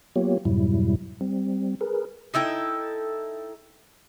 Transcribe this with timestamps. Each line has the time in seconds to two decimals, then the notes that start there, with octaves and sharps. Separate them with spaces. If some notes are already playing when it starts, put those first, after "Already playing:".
0.16 F#3 A#3 B3 F4 G4 C#5
0.45 F2 G#2 B2 F#3 G3 E4
1.21 G3 C4
1.81 G#4 A#4 B4
2.34 D#4 E4 A4 G5